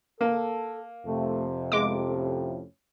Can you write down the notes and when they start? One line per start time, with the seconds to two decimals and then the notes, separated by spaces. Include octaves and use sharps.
0.21 A#3 A4
1.06 F2 C3 A3
1.72 A2 G#3 B3 F4 D6
2.06 A2 F3 C#4